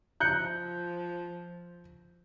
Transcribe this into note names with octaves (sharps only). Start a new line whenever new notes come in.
F3 F#6 G6 C#7